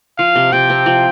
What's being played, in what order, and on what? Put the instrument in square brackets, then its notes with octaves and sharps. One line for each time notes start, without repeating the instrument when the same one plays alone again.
[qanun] F3 [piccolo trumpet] F5
[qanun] C3
[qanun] C3 [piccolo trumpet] G5
[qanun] C4
F3